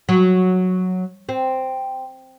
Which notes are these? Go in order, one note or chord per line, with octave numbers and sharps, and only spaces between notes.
F#3
C4